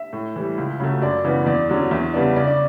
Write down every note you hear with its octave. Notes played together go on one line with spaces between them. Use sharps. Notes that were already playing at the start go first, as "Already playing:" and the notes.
Already playing: E5
A2
E3 G3
C#2
C#3 F#3 A3
F#2 D5
C#3 E3 B3
E2 D5
D3 F#3 C#4
E2 E5
C#3 G3 B3 D4 D5
C#3 D5
D5